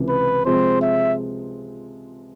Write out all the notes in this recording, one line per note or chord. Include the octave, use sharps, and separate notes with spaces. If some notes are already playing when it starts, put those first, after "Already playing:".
Already playing: C#2 C3 E3
B4
C3 F3 G#3 C4 C5
E5